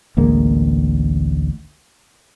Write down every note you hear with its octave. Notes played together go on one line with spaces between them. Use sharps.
A1 D2 G#3 A#3